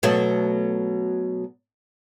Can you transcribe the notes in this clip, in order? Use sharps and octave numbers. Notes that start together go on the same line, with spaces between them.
B2 F#3 A3